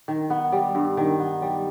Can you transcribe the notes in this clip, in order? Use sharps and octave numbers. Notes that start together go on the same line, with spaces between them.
D#3
B3
G3
G2
D#3
B3
G3